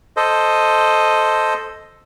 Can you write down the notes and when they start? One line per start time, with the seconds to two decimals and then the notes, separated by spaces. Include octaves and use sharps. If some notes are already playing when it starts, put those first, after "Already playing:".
0.17 A4 C5 D#5